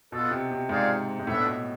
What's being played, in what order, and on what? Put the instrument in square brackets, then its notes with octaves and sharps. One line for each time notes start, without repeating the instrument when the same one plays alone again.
[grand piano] B2 [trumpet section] B3 F4 A4
[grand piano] C3
C3
[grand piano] G#2 [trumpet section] F4 G#4 D5 F5
[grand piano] G#2
[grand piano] A2 [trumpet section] B3 D4 A4 E5
[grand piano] B2